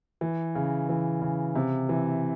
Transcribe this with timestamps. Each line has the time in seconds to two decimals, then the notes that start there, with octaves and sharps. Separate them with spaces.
0.21 E3
0.55 C#3
0.89 E3
1.22 C#3
1.55 C3
1.89 E3